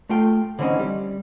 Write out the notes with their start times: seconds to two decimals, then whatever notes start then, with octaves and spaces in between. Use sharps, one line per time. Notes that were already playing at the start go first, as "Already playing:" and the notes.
0.09 A3 F4 G5
0.59 D3 E3 C4 C#4 D#4
0.79 G3